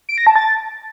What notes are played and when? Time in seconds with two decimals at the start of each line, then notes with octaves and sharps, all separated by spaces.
0.09 D7
0.18 A#6
0.27 A5
0.36 A6